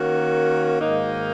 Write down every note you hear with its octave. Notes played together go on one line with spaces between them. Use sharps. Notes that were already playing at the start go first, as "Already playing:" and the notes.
Already playing: D#3 A#3 C#4 F#4 A#4
G#2 D#3 A#3 D#4